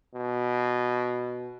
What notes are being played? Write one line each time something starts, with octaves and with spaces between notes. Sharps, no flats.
B2